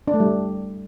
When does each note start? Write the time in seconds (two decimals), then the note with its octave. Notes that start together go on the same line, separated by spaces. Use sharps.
0.08 D4
0.14 A3
0.20 G3